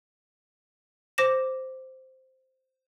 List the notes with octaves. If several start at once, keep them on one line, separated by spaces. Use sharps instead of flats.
C5 D6 A#6 E7